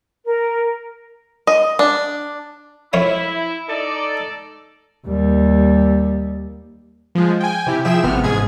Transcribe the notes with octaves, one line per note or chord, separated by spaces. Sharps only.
A#4
D#5
D4
F2 E4 C#5 F5
D#4 A4 D5
D#2 G3
F3 G#3
G5 G#5
C3 E4 G4
F3 G#4 E5 G5 E7
G#1 C3 B3 F6
A1 G#2 G#4 G#6